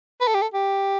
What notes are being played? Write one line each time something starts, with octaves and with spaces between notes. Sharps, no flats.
B4
A4
G4
A4
G4